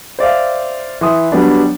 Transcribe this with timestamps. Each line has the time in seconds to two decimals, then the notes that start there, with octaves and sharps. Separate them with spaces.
0.19 C5 D5 E5 F5
1.01 E3 C6 D#6
1.32 F#3 G3 B3 D4